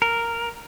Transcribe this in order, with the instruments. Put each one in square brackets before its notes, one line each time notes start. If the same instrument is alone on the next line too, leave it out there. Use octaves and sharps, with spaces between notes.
[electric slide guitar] A#4